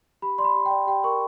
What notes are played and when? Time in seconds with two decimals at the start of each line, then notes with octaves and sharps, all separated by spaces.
0.22 G4 B5
0.38 D5 C6
0.44 B5
0.55 G4
0.66 G5
0.71 D5
0.87 G4 G5
1.04 A#4 C#6